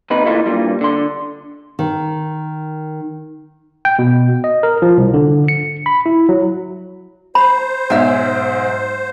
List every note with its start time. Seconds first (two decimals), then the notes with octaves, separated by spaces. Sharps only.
0.10 D#2 C3 D#4 B4
0.26 A#2 E3 A3 D#4 F4
0.46 G2 A#2 G3
0.81 D3 C6
1.79 D#3
3.85 G5
3.99 B2
4.44 D#5
4.63 A#4
4.82 F3
4.97 C2
5.14 D3
5.48 C#7
5.86 B5
6.06 E4
6.29 F#3
7.35 C5 B5
7.90 B1 G#2 C#5 E5 G#5